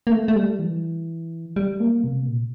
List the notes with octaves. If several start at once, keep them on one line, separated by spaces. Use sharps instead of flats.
A#3
A3
A3
G3
E3
G3
A#3
C3
A#2